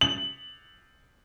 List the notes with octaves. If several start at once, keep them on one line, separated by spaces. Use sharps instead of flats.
F#7